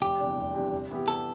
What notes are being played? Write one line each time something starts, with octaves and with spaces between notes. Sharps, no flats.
F1 G4
E2 C3 G3 D4
F1
E2 C3 G3 D4
C3
E3 B3 E4 G4
C3 A4